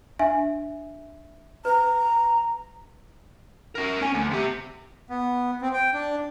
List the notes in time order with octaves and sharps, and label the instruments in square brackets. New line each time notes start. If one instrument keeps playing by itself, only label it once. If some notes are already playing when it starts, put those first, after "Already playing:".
[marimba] D4 G#5 [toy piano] E5
[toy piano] B4 [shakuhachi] A#5
[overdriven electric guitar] C#4 A#4
C#4 G#5
D2
C3 G4
[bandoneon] B3
C4
G5
D4